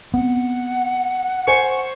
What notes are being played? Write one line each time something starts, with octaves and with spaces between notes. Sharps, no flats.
B3 C4 F#5
C5 G#5 C#6